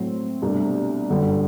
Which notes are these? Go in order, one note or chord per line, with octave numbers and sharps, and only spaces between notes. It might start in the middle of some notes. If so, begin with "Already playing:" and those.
Already playing: A2 F#3 C4
C2 B2 A3 D4
G1 F#2 D3 G3